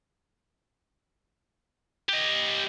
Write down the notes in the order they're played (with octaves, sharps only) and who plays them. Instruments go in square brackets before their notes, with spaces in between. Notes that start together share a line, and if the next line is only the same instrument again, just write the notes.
[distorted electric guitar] G4 D#5